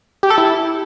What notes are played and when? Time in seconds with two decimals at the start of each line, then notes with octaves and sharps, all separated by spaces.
0.23 G4
0.30 A4
0.38 E4